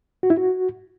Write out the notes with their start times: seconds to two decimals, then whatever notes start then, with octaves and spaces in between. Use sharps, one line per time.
0.23 F#4
0.30 E4
0.37 F#4